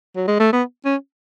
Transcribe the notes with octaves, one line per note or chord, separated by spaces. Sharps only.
F#3
G#3
A3
B3
C#4